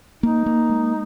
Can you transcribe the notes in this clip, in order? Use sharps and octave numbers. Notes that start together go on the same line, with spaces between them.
A#3 D#4
A#3
G#3